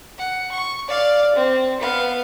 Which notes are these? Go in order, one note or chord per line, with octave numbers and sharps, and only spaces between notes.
F#5
C#6
D5 F5
C4
B3 F5